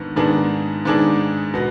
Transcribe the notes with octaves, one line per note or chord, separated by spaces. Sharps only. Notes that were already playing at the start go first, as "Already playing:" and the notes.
Already playing: G#2 D#3 B3 D4
G#2 D#3 B3 D4 G#4
G#2 D#3 B3 D4 G#4
B2 B3